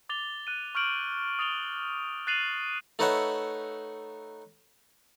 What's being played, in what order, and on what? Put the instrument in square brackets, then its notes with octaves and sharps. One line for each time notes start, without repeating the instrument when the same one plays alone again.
[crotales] D6 A6 F7 G7
F#6 D#7
C#6 F6 G6 D7 F#7
D#6 A6 F7 G7
F#6 A6 C7 D#7 F7 F#7
[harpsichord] A3 D#4 B4 C#5 E5 F#5